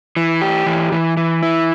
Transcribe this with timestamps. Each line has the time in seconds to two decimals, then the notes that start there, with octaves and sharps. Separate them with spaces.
0.17 E3
0.42 G4
0.66 E3
0.92 E3
1.17 E3
1.43 E4